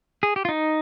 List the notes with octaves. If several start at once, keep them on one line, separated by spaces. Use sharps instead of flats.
G#4
G4
F4
D#4